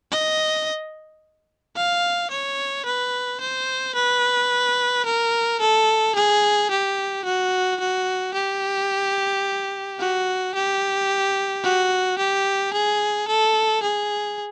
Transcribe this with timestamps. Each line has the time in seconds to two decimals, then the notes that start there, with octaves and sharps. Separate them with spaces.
0.11 D#5
1.76 F5
2.31 C#5
2.85 B4
3.41 C5
3.95 B4
5.05 A#4
5.60 A4
6.15 G#4
6.71 G4
7.25 F#4
7.80 F#4
8.34 G4
9.99 F#4
10.55 G4
11.63 F#4
12.18 G4
12.73 G#4
13.28 A4
13.83 G#4